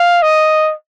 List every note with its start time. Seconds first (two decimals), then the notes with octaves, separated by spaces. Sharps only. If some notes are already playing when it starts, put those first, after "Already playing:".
Already playing: F5
0.22 D#5